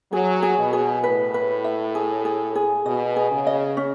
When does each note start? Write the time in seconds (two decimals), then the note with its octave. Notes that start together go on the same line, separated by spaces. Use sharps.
0.13 F#3 G#4
0.42 G#4
0.58 B2
0.73 G#4
1.04 A2 B4
1.34 B4
1.65 E5
1.95 G#4
2.25 G#4
2.55 G#4
2.86 B2 D#5
3.16 G#4
3.31 C#3
3.47 D#5
3.77 C#4